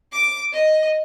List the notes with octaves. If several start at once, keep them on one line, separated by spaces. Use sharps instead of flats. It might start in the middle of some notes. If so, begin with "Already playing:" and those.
D6 D7
D#5